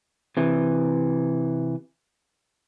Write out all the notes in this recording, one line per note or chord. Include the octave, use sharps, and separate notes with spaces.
C3 E3